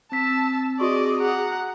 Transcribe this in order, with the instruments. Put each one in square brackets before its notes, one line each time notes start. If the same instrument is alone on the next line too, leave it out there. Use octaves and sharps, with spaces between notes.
[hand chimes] C4 B6 [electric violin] A5 E6
[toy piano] F#4 C#6 [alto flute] G#4 [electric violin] D5 D#5
[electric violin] F#5 A#5